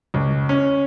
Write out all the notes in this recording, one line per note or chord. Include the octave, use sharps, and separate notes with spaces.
C#2
C#4